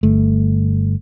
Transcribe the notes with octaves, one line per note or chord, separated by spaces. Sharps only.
G1 A3